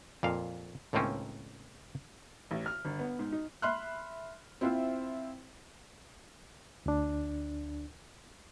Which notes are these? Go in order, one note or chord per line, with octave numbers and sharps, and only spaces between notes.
F2 A#2 F5
C#2 A2 D#3 A#3 C4 C#4
A1
F6
G1
B3
G#2
D#4
E5 B5 C6 F6 F#6
C4 E4 F4 C5 E5
D2 D4